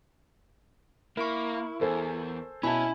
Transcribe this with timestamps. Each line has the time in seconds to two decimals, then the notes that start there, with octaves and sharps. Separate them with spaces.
1.17 A#3 E4 A#4 C#6
1.81 E2 A4 C5 G#5
2.63 B2 C#4 E4 E5 G#5 A5 B5